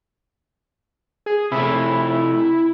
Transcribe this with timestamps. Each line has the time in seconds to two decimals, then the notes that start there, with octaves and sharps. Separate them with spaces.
1.26 G#4
1.52 C3 A3 E4